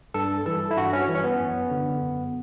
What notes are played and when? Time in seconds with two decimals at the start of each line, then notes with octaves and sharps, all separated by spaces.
0.14 G2 A4
0.46 E3 A4
0.71 E4
0.77 G2 F#4
0.93 C#4
1.08 E3
1.15 C#4
1.24 B3
1.40 F#2
1.71 D3
2.02 F#2